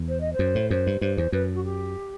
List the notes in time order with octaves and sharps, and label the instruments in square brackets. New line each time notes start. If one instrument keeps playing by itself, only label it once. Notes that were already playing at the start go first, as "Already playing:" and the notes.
Already playing: [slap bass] E2
[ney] C5
D#5
C5
[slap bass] F#2
A2
[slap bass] F#2 [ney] C5
[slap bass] G2
[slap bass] G2 [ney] C5
[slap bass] E2 [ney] C5
[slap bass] F#2 [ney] B4
[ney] F#4
G4